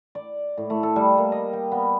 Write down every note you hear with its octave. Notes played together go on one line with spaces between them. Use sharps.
D5
A2
A3
A4
G3
A#3
D#5
G5
B3